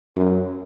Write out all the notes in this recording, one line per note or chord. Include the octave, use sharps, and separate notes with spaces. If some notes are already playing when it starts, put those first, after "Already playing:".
F#2